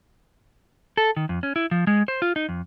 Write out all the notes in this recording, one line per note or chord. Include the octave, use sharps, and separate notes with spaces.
A4
D#3
F2
C#4
E4
F3
G#3
C5
F4
D#4
F2